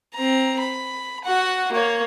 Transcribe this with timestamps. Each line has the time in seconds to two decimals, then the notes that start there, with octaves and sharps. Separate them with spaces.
0.15 C4 A#5
0.60 B5
1.25 F#4 F#5
1.72 A#3 C#5